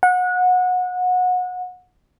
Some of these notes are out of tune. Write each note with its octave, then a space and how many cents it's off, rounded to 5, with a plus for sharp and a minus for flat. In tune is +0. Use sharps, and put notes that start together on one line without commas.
F#5 -25